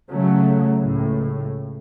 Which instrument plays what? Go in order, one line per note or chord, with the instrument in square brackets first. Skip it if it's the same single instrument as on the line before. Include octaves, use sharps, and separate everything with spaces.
[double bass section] C#3 F#3 A3
C#2 A2